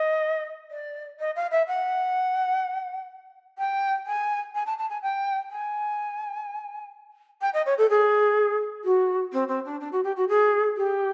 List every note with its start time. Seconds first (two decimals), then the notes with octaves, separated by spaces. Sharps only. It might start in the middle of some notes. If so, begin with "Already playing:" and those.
Already playing: D#5
0.71 D5
1.19 D#5
1.36 F5
1.51 E5
1.67 F#5
3.58 G5
4.06 G#5
4.55 G#5
4.66 A5
4.78 A5
4.89 G#5
5.02 G5
5.50 G#5
7.41 G5
7.53 D#5
7.66 C#5
7.78 A4
7.90 G#4
8.84 F#4
9.32 C4
9.48 C4
9.65 D4
9.80 D4
9.92 F#4
10.04 G4
10.16 F#4
10.28 G#4
10.77 G4